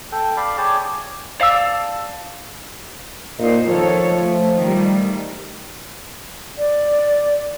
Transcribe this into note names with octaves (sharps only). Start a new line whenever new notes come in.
A4 G5
D5 F5 B5
G#4 C#5 D5 G5 A5 D6
D5 F5 A5 E6
A#2 D#4 C5
D#3 F3 A4 C#5
A3
D#3 G3 A3
D5